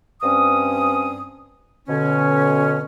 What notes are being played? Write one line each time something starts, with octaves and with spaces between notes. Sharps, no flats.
G2 C4 C#4 D#6
B2 D3 C#4